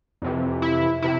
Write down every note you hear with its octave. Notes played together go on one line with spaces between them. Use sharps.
F2 C3 E3
E4
C3 E4